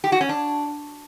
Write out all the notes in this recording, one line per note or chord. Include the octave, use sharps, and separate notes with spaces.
G4
F#4
C#4
D4